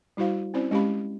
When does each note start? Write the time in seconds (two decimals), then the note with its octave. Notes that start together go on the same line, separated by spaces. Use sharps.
0.17 G3 E4 F#4 C5 F5
0.54 C4 C#4 E4 C5 D5
0.71 G#3 C#4 G4 F5 B5